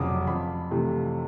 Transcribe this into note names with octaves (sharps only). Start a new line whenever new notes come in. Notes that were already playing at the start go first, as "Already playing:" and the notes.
Already playing: F1 F2 C#3 F#3 D6 D#6
F2 B5
C3 E3 A3